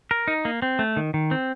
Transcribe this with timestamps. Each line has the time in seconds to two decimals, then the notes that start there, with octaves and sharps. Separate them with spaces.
0.11 A#4
0.28 D#4
0.45 A#3
0.62 C4
0.79 A3
0.97 D#3
1.14 D#3
1.31 C4